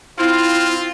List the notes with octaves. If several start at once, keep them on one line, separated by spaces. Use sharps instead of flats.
C4 E4 F4 F5